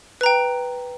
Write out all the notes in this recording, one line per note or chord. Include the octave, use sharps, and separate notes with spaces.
B4 G5 A#5